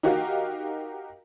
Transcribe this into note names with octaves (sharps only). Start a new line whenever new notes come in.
D#4 F#4 G4 A#4 F5